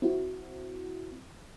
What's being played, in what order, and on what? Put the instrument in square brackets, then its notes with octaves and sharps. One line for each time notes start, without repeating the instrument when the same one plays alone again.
[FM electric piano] C4 E4 F#4